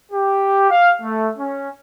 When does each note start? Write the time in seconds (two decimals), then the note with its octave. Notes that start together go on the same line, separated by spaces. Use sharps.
0.12 G4
0.70 F5
1.02 A3
1.38 C#4